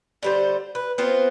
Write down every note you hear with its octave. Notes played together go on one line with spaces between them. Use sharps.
D3 G3 C5
B4
B3 C4 F4 C5